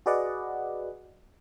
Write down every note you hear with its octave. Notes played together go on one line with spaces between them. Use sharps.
F#4 G#4 B4 D5 D#5 F#5